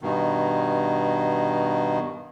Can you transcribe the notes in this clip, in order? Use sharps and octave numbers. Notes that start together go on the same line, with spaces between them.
G2 B2 D#3